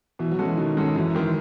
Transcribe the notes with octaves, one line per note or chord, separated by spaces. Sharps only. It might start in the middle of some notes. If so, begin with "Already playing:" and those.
B2 E3
F#3
G#3 C#4 F#4 A4
E3
B2 D#3
G#3 C#4 F#4 A4
F#2 E3
D#3 G#3